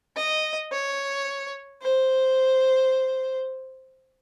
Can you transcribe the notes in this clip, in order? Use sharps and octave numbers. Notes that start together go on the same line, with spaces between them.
D#5
C#5
C5